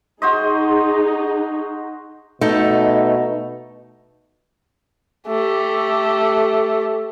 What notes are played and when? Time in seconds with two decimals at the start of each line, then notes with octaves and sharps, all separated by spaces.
0.22 D#4 F#4 G#4 C5 D#5
2.41 B2 A3 D#4 A4
5.28 A3 G4